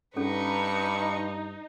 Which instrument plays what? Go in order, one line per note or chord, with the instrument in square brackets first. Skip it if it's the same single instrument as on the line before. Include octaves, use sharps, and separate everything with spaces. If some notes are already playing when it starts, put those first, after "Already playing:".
[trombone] G2 [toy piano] C#4 A4 C#5 [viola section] D#4 [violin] B4 C#6